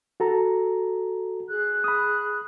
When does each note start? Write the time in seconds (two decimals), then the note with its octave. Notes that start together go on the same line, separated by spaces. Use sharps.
0.20 F#4 A4 A#5
1.49 G#4 F#6
1.84 B5 D#6